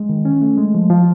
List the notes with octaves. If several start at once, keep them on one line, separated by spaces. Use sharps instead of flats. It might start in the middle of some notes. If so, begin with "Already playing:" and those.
Already playing: G#3
D#3
C#4
A3
G#3
F3
F3